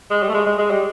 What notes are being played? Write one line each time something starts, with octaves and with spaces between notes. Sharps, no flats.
G#3
G3
A3
G#3
G#3
G#3
G3